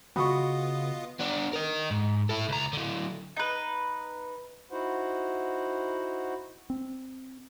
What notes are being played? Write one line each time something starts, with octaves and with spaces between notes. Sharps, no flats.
C#3 B3 F4 F#4 D#5 B5 C#6 D#6
B3 D4
A#4 D#5
G#2
E4 A4
C#2 A#5
D3 F#3
D#4 B4
D#4 E4 F#4 C5 F#5
C4